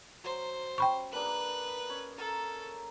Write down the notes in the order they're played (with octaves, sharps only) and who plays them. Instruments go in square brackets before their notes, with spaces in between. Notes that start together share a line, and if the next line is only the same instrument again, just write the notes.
[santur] F#3 [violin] C5
[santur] C#4 [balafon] G5 B5 C#6
[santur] A#3 D4 G#4 [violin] B4 F#6
[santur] C#4 C#5
[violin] A4 [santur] A#4